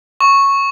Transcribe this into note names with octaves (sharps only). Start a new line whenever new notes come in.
C#6